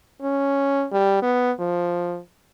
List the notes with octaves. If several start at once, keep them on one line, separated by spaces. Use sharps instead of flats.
C#4
G3
B3
F3